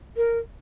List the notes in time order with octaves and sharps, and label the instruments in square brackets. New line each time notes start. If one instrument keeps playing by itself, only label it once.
[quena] A#4